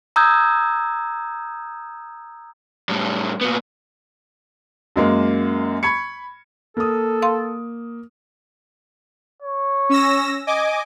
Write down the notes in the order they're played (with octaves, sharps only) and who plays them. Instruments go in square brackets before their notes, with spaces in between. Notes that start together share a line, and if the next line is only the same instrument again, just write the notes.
[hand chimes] A#5 D#6 E6 G6 G#6
[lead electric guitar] A2 G3
A#2 B3
[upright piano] F#2 G#3 A#3
B5 C#6 G#6 C#7
[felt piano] A#3 D#6 [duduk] A4
[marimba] F5 C6
[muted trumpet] C#5
[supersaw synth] C#4 E6 A#6
D#5 G#5 D6